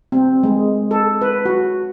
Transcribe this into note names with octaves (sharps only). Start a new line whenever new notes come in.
C4
G#3
A4
B4
F#4